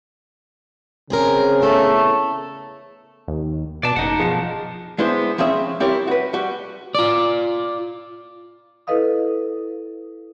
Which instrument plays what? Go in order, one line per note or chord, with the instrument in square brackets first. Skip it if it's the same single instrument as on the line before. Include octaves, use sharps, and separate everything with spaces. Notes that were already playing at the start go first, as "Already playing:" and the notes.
[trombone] C#3 [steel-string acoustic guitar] C4 G#4 A#4
[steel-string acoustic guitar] E2 A4 [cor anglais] A3
[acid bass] D#2
[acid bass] B2 [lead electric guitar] D5 A5
[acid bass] F#1 [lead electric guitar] D#4 F#5
[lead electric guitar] B2 F3 [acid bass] G#4
[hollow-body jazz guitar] G#3 B3 D4 E4 C5
F3 C4 C#4 G#4 E5
G3 C4 E4 G4 A#4 C#5
F#4 B4
G3 F#4
[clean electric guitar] F4 D5
[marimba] E4 A4 B4 D#5 F5 D#6